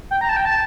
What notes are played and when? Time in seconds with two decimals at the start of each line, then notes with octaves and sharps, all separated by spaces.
0.11 G5
0.21 A#5
0.29 A5
0.36 G5
0.45 A5